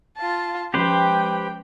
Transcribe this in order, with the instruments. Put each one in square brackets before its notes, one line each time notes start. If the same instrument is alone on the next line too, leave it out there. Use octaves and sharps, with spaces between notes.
[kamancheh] F4 A5
[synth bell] F3 G#3 C#4 [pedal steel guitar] G4 B4 C5 [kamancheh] G5